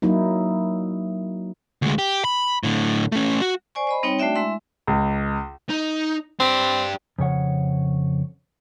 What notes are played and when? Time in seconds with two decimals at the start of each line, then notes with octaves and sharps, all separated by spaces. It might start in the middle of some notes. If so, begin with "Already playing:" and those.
0.02 F#3 A#3 D#4 E4
1.82 D2 G#3
1.98 G4
2.25 B5
2.63 A2 D3
3.12 A3 C#4
3.41 F#4
3.75 C5 D5 G#5 C#6
3.87 C5 D#5 B5
4.03 G3 C4 D#4 C#5 G5
4.19 A3 D4 F#4 D5 E5 G5
4.35 G#3 E4 E5 C6
4.87 C#2
5.69 D#4
6.40 C4 D4 G4
7.19 F2 C#3 C#5 F#5